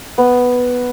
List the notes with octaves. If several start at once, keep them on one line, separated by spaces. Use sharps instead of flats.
B3